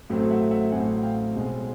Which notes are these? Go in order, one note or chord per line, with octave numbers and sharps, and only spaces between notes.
A1 A2 F#3 A3 C4
E5 F#5
E5 F#5
A1 A2 F#3 A3 C4 F#5 G#5
F5 G5
B1 B2 G#3 C4